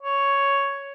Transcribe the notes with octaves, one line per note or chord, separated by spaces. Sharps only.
C#5